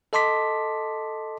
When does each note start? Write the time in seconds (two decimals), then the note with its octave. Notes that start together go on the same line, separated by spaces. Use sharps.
0.13 A4 D#5 A5 C6 D6 B6